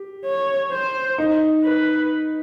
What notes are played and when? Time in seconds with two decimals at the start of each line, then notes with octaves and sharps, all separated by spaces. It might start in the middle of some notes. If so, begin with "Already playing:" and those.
Already playing: G4
0.25 C#5
0.72 C5
1.18 D#4
1.64 B4